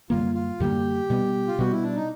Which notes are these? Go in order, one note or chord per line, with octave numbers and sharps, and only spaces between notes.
F#2 D3 G3 A#3 F4
F4
F#2 D3 G3 A#3 G4
B2 G3 B3
F4
B2 G3 B3 F#4
E4
D4
D#4